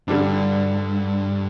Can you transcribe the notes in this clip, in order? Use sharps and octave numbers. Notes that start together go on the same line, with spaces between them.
G2 D3 G3 D4